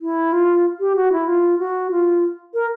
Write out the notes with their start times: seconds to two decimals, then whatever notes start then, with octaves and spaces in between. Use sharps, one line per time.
0.01 E4
0.33 F4
0.80 G4
0.96 F#4
1.12 E4
1.28 F4
1.59 F#4
1.91 F4
2.54 A#4